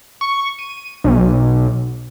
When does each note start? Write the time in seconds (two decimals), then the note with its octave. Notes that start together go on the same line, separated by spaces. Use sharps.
0.21 C#6
0.59 D#7
1.04 B1